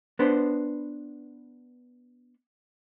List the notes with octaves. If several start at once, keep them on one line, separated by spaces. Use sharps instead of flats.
B3 D4 B4 C5